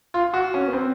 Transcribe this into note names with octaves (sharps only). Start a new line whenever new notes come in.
F4
F#4
C#4
B3
C4